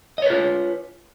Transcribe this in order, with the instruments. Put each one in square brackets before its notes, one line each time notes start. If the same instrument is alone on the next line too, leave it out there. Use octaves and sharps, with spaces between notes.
[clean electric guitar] D#5
C#5
B4
F4